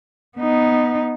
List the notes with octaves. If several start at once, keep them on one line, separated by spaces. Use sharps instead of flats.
B3 D#4